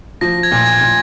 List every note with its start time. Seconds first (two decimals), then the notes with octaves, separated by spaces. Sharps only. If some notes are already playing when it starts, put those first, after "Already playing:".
0.21 F3 A#6
0.43 G#6
0.51 A#2
0.66 G#6
0.81 A#2